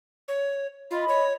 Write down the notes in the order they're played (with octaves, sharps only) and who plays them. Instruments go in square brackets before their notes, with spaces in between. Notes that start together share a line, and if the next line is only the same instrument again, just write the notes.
[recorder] C#5
[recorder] F4 [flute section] D#5 B5
[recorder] C#5